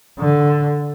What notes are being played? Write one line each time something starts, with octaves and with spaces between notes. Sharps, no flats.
D3